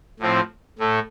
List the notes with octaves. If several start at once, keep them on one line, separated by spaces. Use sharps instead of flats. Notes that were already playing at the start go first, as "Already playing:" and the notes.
A2 F3 C4
A2 A3